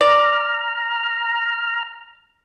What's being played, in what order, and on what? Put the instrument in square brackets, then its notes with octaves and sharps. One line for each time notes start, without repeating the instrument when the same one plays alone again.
[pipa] D5 [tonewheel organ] A#5 F6